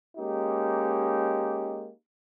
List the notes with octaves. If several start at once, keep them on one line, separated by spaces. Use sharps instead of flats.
G#3 A#3 C#4 D#4 G4